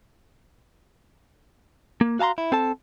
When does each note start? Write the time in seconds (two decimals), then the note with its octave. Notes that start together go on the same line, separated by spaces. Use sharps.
2.01 A#3
2.19 F#4 F5 A5 A#5 C6
2.38 E4
2.52 C4 A4 A5